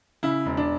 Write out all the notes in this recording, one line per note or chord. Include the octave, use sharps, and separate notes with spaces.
C#3 E4
E1
D4